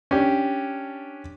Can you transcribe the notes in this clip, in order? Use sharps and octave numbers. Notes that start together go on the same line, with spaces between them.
C#4 D4 G4